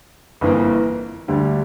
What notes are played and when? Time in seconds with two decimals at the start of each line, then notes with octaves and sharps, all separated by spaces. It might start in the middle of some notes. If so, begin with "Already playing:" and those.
0.41 G1 F2 E3 A#3
1.28 D2 D3 G3